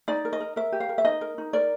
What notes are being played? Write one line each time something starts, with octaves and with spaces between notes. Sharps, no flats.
D#4 D5
A#4
D#5
A#4
A#4 E5
G4
F5
A#4
E5
D#4 D#5
A#4
D#4
A#4 D5